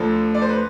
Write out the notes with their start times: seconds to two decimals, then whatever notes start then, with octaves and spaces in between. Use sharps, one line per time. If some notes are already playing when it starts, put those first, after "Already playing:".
Already playing: D2 D3 F3 A4
0.34 D5
0.42 C5
0.49 B4